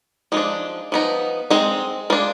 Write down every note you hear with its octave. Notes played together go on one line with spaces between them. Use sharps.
F3 G#3 D4 D#4
F3 B3 D#4
G#3 C4 D#4
G#3 D4 F4